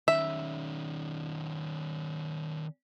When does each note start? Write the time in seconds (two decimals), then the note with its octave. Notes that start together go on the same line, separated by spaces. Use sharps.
0.08 D#3 C#4 E5